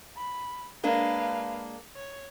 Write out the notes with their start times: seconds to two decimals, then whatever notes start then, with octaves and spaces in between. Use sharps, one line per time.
0.17 B5
0.84 G#3 A#3 D4 B4 F5
1.96 C#5